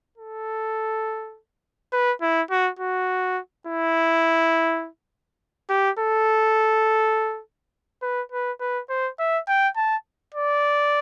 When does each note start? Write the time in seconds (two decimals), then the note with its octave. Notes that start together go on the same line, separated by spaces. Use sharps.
0.18 A4
1.93 B4
2.22 E4
2.51 F#4
2.79 F#4
3.67 E4
5.70 G4
5.99 A4
8.02 B4
8.32 B4
8.61 B4
8.90 C5
9.19 E5
9.48 G5
9.76 A5
10.34 D5